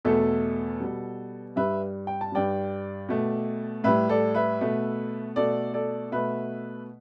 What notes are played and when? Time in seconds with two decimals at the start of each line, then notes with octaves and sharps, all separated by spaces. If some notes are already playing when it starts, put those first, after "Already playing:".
0.05 E2 B2 A3 A4
0.80 B2 G3
1.56 G2 G3 B4 E5
2.07 G5
2.21 A5
2.32 G2 G3 D5 G5
3.09 B2 A3
3.84 A2 G3 B4 E5
4.09 A4 D5
4.35 B4 E5
4.61 B2 A3
5.36 B2 A3 A4 D5
5.74 A4 D5
6.12 B2 A3 B4 E5